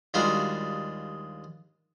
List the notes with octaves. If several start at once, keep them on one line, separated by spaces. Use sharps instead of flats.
D#2 G3 G#3 D4 F4 F#4